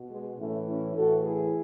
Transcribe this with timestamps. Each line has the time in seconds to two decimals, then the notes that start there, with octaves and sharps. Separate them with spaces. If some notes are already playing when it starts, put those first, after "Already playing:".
Already playing: B2
0.09 G#3 B3
0.37 A2 E3 A3 C#4
0.67 C#4 E4
0.95 A2 E3 F#4 A4
1.23 E4 G#4